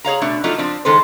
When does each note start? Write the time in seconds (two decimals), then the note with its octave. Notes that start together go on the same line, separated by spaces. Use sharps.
0.05 G#4 C#5 F5 A#5
0.22 B2 A3 D4
0.44 F3 F#3 A3 D4 D#4 F4
0.58 F3 C4 D4
0.85 D#3 G#3 A4 B4 C5